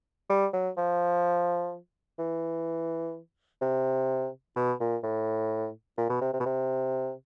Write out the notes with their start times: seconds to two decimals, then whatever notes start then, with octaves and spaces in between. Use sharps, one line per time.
0.30 G3
0.53 F#3
0.77 F3
2.19 E3
3.62 C3
4.56 B2
4.80 A#2
5.03 A2
5.98 A#2
6.10 B2
6.21 C3
6.33 C3
6.40 B2
6.46 C3